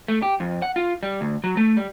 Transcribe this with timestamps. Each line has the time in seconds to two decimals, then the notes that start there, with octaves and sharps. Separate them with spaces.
0.08 A3
0.22 G4
0.40 F2
0.62 F#5
0.76 F4
1.03 G3
1.21 D2
1.44 F#3
1.57 A3
1.77 G3